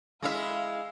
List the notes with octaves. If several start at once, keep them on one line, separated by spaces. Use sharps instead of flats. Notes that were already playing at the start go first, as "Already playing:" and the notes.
G#3 E4 E5 F5